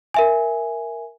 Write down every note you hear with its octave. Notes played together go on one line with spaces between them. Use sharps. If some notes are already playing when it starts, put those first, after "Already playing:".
A#4 E5 G#5